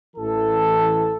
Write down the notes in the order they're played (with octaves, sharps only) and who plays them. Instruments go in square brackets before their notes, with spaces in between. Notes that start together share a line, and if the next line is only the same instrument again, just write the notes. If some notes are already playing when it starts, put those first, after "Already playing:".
[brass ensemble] A1 E3 A4